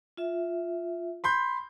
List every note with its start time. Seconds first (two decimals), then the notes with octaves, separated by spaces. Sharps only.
0.17 F4 E5
1.24 B5 C6 G6